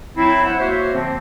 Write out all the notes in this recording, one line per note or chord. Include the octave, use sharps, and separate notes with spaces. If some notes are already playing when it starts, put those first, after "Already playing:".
F#3 A3 C4 E4
C5 E5 F#5
A3 A#3 F#4 C5 C#5 E5
D3 F3 A#3 C4